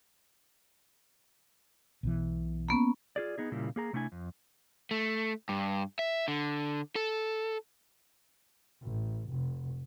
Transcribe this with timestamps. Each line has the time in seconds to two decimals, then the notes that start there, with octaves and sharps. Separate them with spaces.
2.03 B1 B2 E3
2.69 A#3 B3 C#4
3.16 F4 G#4 D5
3.38 B3 D#4 G#4
3.52 A#2 C#3 G3 A#3 E4
3.76 A#3 G#4 A#5
3.93 C3 A3 D4 E4 G#5
4.12 F2
4.91 A3
5.49 G2
5.99 E5
6.28 D3
6.96 A4
8.82 A1
9.30 F1